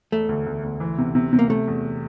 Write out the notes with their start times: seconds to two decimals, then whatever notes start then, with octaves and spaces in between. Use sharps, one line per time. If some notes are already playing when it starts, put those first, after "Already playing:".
0.12 E1 A3
0.29 D2
0.46 D2
0.64 D2
0.80 E3
0.98 C3
1.15 C3
1.33 C3
1.39 A#3
1.50 C3 A3
1.68 E2